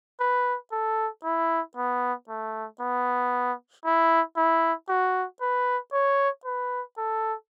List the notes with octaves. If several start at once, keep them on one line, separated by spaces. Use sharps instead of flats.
B4
A4
E4
B3
A3
B3
E4
E4
F#4
B4
C#5
B4
A4